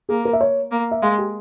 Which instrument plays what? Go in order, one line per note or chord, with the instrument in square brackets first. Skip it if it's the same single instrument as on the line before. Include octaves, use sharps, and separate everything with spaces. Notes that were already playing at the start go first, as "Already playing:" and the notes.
[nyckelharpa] A#3 [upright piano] G#4
[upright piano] A#4
E5
C#5
[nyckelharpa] A#3
[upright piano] E5
[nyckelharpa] G#3 [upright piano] F5
[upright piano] G4